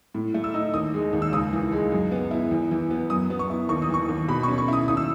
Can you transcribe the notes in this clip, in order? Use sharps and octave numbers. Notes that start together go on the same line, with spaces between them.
A2
A3
E6
D#4
D#2 D#6
G#3
D#2
E6
C#2 D#6
E3
G#3
F#2
B3
E4
E2
E3
B3
F#2 D#6
B3
C#6
E4
D#2 C#6
D#6
E3 C#6
D#2
B2 B5
C#4 C#6
C#6
E4 D#6
D#2 D#6
E6